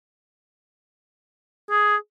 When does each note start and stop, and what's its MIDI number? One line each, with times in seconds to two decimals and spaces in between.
1.70 1.96 68